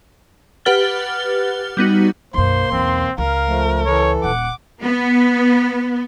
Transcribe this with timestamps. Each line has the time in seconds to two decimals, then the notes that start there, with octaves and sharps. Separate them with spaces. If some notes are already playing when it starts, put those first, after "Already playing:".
0.65 G4 B4 F#5 F6 A6 G7
1.77 G3 B3 D#4 F#4
2.34 B1 F#2 A#3 C5 C6
2.72 B1 E2 C4
3.18 C#2 A#4 F5
3.47 F3 A3
3.86 E3 A4 C#5
4.24 D#1 F#5 D6
4.82 B3